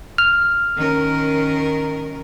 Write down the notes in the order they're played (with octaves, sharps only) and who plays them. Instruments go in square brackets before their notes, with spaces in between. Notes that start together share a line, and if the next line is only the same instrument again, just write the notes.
[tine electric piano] F6
[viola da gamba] D#3 C#4 A#4